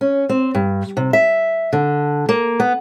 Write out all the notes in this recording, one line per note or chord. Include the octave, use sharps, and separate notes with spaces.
C#4
C4
G2
C3
E5
D3
A#3
B3